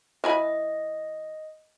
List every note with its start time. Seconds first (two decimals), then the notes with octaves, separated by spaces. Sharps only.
0.24 E3 D#5 G#5 B5